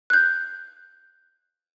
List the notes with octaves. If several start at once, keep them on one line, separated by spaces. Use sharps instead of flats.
F#6 G6